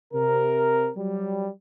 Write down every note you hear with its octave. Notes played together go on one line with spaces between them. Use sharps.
C3 A#4
F#3 G3